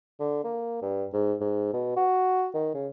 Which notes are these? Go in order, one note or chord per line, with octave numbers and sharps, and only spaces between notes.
D3
A#3
G2
G#2
G#2
B2
F#4
D#3
C#3